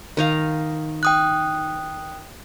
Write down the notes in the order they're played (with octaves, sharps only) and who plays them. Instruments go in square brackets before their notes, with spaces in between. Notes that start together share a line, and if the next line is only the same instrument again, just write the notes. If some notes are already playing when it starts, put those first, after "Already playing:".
[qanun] D#3 D#4 F5
[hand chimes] G5 D#6 F#6